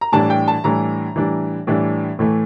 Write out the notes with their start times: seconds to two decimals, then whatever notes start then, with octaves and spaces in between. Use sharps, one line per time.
0.01 A#5
0.13 A2 E3 G3 D4 A5
0.30 G5
0.48 A5
0.64 A2 E3 G3 D4 A#5
1.16 A2 E3 G3 D4
1.67 A2 E3 G3 D4
2.19 A2 E3 A3